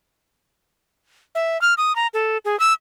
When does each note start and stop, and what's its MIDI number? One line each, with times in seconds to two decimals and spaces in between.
1.35 1.60 76
1.62 1.74 89
1.78 1.95 87
1.96 2.07 82
2.14 2.38 69
2.45 2.58 68
2.60 2.73 88